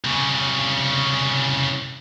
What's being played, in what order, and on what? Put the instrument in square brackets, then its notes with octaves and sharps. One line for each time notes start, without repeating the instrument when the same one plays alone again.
[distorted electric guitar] C2 C#3